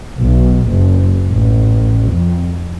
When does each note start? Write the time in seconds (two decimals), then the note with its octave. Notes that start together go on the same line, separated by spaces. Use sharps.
0.21 B1
0.70 F#1
1.30 A1
2.11 F2